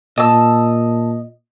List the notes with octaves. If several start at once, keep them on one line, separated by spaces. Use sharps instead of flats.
A#2 D#5 A5 E6